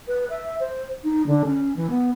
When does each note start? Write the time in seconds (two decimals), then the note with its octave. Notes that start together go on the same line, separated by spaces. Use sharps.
0.08 B4
0.30 E5
0.60 C5
1.04 D#4
1.26 D3
1.45 C#4
1.76 E3
1.90 B3